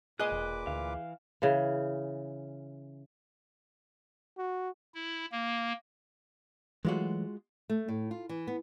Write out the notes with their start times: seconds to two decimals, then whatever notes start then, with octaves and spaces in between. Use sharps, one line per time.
0.20 A#2 G#4 B4 D#5 D6 F#6
0.32 E1
0.67 D2 E3 F5
1.42 C#3 E3
4.38 F#4
4.94 E4
5.32 A#3
6.85 E3 F#3 G#3 A3 F4 F#4
7.70 A3
7.88 A2
8.11 F4
8.29 E3
8.47 B3